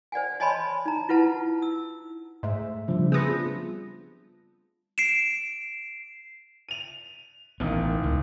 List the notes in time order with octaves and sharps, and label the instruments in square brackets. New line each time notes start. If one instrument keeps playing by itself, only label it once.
[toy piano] C5 D5 F#5 G#5
C#5 D#5 G#5 A5 B5 C6
D#4 A#5
E4 F4 B4 F#5 A5
E6
[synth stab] G#2 [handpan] A3 E5
[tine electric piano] C#3 F3 [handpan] G3 D4
[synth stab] B3 C4 [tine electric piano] G#4 A#6
[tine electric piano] F4
[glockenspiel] C7 D7 E7
[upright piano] D#7 F7
[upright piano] E1 D#3 [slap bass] A1 B3
[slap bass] C#2